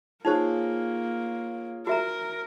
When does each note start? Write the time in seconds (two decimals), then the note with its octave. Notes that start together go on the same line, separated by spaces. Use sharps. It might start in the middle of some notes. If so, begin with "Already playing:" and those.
0.25 A#3 D#4 F4 G#4 C5 C#5
1.87 F#4 A#4 E5 A#5